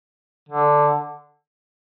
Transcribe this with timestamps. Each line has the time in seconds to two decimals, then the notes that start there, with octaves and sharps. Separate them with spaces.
0.49 D3